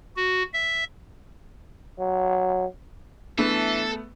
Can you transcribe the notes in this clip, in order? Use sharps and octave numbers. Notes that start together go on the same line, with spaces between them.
F#4
E5
F#3
E3 A3 B3 D4 A4